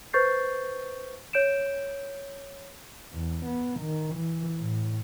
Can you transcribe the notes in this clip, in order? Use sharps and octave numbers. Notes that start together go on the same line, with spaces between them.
B4 C5 C#6 G6 A6 C7
C#5 G6 D7 E7
E2
B3
D#3
E3
A2